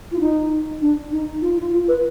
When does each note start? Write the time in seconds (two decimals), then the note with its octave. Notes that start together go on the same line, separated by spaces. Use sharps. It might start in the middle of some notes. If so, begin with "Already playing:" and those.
0.12 F4
0.20 D#4
0.81 D4
1.12 D#4
1.42 F4
1.57 F4
1.72 F4
1.88 B4